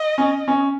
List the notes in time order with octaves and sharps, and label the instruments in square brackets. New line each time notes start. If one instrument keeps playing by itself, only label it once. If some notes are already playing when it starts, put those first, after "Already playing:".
Already playing: [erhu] D#5
[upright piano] C#4
C#4